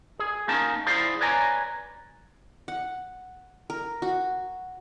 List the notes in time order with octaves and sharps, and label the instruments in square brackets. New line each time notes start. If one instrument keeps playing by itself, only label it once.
[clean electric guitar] G#4
A#3 C#4 D#4 A#4 A5
E4 G#4 C5 D5 F5
B4 C#5 D5 G#5 A#5
[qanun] F#5
A#4
F#4